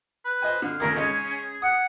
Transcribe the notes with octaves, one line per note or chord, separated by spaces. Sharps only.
B4
C5 D#5 G#5
D3 F5
D#2 C#3 A3 G#4 A#4
C#3 G#3 C#4 D#4
F#5 D#6